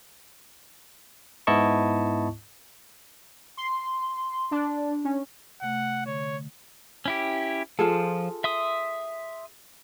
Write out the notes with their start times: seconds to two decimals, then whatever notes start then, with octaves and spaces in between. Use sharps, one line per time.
1.47 G#2 B3 E4 D#5 A5 C#6
3.57 C6
4.51 D4
5.04 C#4
5.62 C3 A3 F#5
6.06 D3 C#5
7.06 C#4 E4 G4
7.79 F3 F4 G#4 A4
8.44 E5 C6 D#6